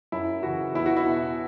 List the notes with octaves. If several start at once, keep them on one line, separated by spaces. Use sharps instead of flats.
F#2 E4
C#3 E3 F#4
E2 E4
F#4
E4
B2